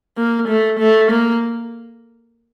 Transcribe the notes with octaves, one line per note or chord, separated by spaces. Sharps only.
A#3
A3
A3
A#3